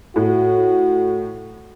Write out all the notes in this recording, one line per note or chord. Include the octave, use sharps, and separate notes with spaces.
A2 F#4